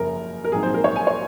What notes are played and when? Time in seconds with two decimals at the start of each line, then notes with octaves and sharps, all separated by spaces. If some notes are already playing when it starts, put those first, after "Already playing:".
Already playing: F#1 F#2 C#3 F3 A#4
0.44 A#4
0.52 A#1 G#2 F#3 C4 D#4 G#4
0.63 C5
0.74 A#4
0.84 C#5
0.96 G#5
1.07 C#5